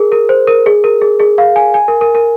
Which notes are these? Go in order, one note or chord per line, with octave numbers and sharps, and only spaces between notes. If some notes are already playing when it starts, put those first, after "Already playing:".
Already playing: G#4 A#4
A#4
C5
A#4
G#4
A#4
G#4
G#4
F5
G#5
G#5
A#4
A#4
A#4